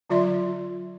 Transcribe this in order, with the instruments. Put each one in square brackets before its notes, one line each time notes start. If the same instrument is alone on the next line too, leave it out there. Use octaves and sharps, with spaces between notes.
[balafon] D3 F#3 F4 D5 E5 C6